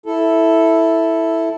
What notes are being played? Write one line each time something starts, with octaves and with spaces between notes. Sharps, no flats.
E4 A4